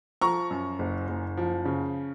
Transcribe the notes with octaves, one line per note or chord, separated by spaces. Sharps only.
F3 A#5 C#6
F#2
F#1
F#1
F3
C#3